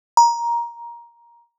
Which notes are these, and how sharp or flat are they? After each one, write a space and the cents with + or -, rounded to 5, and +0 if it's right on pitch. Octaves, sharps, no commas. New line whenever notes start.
A#5 +15